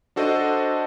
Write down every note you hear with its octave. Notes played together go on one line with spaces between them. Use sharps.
D4 F#4 A4 C5 D5 D#5